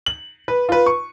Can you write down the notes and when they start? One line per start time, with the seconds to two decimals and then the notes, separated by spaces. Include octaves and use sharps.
0.06 F#7
0.48 B4
0.69 F4 B4
0.86 C#6